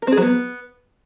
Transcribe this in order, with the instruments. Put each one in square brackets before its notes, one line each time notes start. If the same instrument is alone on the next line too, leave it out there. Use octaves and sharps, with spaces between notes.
[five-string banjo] A#4
C4
G#4
F#3
B3